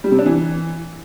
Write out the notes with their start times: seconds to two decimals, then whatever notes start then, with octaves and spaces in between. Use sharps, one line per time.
0.04 G3
0.11 C3
0.19 D4
0.26 E3